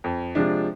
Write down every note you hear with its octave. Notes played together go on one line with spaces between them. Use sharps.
F2
C3 F3 G#3 D4